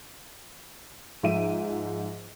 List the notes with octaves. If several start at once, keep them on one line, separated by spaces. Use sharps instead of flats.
G#2 F3 F4 E5 D7 D#7